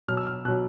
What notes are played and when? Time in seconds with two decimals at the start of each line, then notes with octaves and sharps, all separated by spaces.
0.08 B2 F#3 F6
0.17 E6
0.27 F6
0.45 B2 F#3 F#6